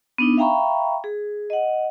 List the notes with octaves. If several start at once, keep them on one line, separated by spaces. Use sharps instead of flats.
B3 D4 D#4
E5 F5 G5 A#5 B5 C#6
G#4
D#5 F#5